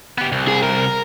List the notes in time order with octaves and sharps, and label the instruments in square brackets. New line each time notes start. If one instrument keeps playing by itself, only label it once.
[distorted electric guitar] B3 G4
C2
[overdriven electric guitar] G#4
A#4